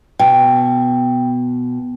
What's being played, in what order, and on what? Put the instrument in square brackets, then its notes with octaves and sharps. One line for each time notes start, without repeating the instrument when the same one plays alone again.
[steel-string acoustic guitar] B2 [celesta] G5